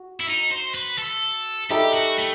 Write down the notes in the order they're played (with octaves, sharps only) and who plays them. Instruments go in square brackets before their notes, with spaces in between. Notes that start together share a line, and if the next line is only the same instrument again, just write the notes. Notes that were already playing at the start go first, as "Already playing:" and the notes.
Already playing: [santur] F#4
[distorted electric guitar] E4
D#4
C5
B4
A4
[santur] G3 D#4 A4 E5 [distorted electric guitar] G4
[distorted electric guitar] F#4
A3